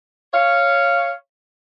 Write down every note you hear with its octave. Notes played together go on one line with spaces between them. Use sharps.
C#5 F5